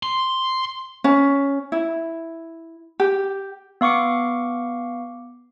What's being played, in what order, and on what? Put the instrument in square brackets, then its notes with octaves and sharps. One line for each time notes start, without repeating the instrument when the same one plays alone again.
[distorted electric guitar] C6
[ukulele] C#4
E4
G4
[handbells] B3 F5 C#6 D6 C#7